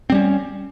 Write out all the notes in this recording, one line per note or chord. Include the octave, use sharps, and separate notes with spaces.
G3 C4 C#4